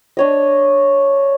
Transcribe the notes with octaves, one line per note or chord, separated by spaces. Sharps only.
D4 C#5 D#5